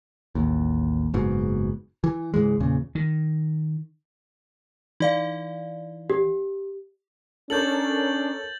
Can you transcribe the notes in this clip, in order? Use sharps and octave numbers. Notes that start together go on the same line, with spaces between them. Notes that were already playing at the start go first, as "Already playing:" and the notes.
A1 D#2
F#1 G#2 B2
E3
C#2 G#2 E3 G#3
E2 A#2 C#3
D#3
E3 D#4 D5 F5
G4
C#4 D4 A4 A#4 C#5 G6 A6 F#7